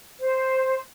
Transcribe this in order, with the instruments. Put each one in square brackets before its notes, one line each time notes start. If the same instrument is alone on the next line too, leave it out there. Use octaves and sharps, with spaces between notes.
[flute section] C5